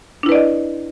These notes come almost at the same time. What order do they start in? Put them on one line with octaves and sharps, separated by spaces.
D4 E4 B4 D5 D#5